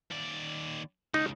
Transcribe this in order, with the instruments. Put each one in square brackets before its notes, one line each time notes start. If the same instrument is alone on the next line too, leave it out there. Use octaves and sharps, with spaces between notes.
[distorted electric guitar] D#2 D5
[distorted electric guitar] C#2 [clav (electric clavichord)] D#4